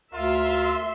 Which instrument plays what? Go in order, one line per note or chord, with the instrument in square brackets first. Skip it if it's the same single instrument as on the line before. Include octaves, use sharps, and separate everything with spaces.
[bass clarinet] D2 [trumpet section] F4 A#4 F5 [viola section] E5 C6